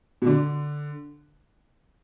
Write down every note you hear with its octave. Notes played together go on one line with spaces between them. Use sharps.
B2
D3